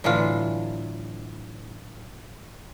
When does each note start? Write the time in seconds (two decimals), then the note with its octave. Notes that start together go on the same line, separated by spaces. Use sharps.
0.04 A2 D3 E3 F#3 F4